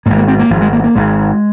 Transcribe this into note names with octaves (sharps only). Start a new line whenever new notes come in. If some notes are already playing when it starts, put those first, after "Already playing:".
G#1 G#2 A#3
A#3
C4
A#3
G#1 G#2 F3
G#3
A#3
A#3
G#1 G#2 G#3